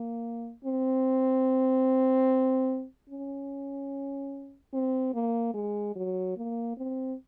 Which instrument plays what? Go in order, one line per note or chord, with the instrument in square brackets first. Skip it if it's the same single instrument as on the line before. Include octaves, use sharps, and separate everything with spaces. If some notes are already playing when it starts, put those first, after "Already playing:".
Already playing: [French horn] A#3
C4
C#4
C4
A#3
G#3
F#3
A#3
C4